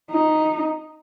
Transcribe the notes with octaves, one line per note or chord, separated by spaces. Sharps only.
D#4